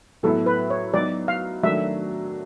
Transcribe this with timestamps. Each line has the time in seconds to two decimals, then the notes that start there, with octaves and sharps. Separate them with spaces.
0.23 A2 F#3 B3 E4 A4
0.46 B4
0.70 C#5
0.93 F#3 B3 D#4 D5
1.28 F5
1.63 D#3 F#3 A3 D4 E5